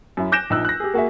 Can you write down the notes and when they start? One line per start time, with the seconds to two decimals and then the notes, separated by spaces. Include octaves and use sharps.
0.17 F#2 E4
0.32 D6 F#6 G6 A#6 D7 E7
0.50 A#1 D#4 E6 F#6
0.65 F#6 A#6
0.80 G4 G#4
0.94 A#3 F#4 G#4 E5